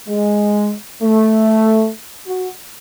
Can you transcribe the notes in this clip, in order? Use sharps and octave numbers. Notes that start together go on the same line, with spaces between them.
G#3
A3
F#4